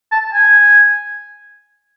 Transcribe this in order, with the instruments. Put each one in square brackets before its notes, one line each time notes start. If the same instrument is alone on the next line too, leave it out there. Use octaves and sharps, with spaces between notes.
[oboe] A5
G#5